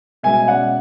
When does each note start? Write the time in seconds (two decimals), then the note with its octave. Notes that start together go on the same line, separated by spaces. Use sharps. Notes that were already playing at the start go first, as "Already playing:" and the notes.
0.23 B2 G#3 C#4 E5 G#5
0.48 D5 F#5